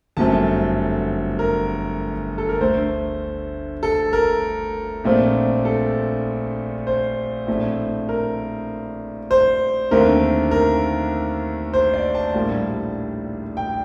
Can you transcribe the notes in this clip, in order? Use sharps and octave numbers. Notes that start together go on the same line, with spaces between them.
G1 F#2 F#3 A3 C4 A5
A#4
A4
A#4
D2 D3 A3 C5
A4
A#4
A#1 A#2 A3 C4
A4
C5
A#1 A2 A3 C4
A#4
C5
D#2 D3 A3 C4 A#4
A#4
C5
D5
A5
A#1 A2 G3 A#3
G5